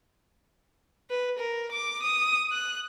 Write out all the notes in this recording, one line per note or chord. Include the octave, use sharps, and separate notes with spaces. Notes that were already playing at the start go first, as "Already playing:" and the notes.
B4
A#4
D6
D#6
F#6